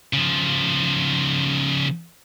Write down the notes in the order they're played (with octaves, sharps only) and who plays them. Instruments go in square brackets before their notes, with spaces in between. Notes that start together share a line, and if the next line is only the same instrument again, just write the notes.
[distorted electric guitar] C#3 F3